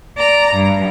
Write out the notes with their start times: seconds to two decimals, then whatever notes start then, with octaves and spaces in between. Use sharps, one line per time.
0.17 D5 A#5
0.54 G2